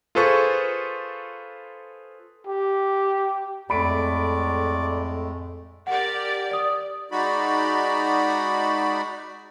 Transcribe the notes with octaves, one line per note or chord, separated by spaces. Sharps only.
F4 G#4 A4 B4 C5 C#6
G4
F2 A2 G#3 A3 D5 B5 D7
G4 A#4 D5 F#5
D5 D#6
G#3 D#4 F#4 D5 B5